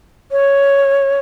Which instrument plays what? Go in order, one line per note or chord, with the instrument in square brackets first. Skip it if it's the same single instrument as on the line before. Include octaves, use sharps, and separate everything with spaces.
[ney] C#5